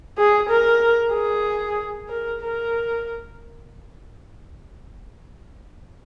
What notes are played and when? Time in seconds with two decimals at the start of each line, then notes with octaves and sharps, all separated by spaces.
0.18 G#4
0.50 A#4
1.13 G#4
2.09 A#4
2.42 A#4